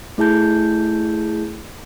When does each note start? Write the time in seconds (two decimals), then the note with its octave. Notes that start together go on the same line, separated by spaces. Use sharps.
0.18 A3 E4 G#4 A5 G6